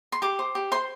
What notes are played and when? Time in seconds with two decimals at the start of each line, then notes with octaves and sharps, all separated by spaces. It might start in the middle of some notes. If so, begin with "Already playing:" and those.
0.12 C6
0.22 G4 D6
0.39 C5
0.55 G4
0.72 C5 C6